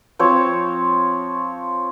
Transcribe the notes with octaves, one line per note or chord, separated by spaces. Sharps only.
F3 C4 C#5